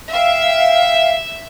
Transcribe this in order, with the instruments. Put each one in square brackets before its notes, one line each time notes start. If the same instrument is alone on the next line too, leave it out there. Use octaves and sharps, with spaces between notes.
[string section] E5 [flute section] F5 G5